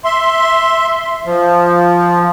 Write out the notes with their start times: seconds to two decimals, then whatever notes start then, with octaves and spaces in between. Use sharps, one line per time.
0.04 E5 C6
1.25 F3